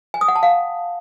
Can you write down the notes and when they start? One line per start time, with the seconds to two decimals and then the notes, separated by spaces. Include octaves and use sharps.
0.14 G#5
0.21 D#6
0.28 F#5
0.36 A5
0.43 F5